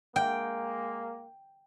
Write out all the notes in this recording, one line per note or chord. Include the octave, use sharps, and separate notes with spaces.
G#3 A#3 G5